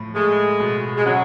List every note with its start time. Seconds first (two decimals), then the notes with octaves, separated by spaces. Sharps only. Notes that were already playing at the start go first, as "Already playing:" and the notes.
Already playing: A2 F3
0.15 G#3 A3
0.60 B2
0.96 G#3
1.06 C#3 F#3